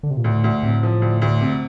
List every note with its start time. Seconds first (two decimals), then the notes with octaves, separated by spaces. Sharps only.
0.03 D3
0.11 C3
0.17 A#2
0.24 D2 A2
0.44 D2
0.63 A2 C3
0.83 F3
1.02 D2
1.22 D2
1.41 C3